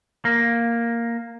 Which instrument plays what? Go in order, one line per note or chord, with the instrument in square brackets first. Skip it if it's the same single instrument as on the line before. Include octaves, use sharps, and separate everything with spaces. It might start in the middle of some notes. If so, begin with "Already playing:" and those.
[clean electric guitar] A#3